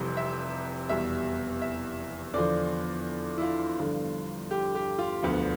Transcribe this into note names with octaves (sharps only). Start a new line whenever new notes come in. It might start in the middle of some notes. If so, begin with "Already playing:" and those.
Already playing: F1 F2 C3 E3 G3 C5
E5
F1 E2 B2 G3 E5
E5
E2 D3 F3 D5
E4
F4
G1 G2 D3 F3
G4
G4
F4
E1 D2 D3 F3 B3